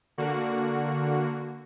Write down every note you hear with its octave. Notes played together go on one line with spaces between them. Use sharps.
D3 A#3 F#4